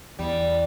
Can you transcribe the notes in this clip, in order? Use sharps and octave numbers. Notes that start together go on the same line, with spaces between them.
E2 G3